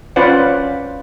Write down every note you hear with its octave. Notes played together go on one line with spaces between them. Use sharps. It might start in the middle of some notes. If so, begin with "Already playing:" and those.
C#4 F4 B4 C5 D5 F#5